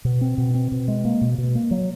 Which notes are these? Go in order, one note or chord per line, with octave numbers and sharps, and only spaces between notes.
B2
C4
B2
C4
B2
G#3
A#3
B2
B2
A#3
F#3